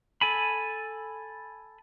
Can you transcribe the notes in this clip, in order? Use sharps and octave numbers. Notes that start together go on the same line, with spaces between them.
A4 G#5 B5